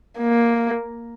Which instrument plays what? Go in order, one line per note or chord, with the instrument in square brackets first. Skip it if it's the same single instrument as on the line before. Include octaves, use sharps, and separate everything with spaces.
[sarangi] A#3